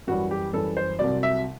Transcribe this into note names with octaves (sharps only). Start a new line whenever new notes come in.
F#2 E3 G3 F#4
G4
F#2 E3 G3 A4
C5
C2 C3 F#3 D5
E5